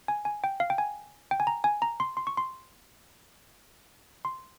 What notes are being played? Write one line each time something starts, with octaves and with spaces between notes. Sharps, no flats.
G#5
G#5
G5
F5
G5
G#5
G5
G#5
A#5
G#5
A#5
C6
C6
C#6
C6
C6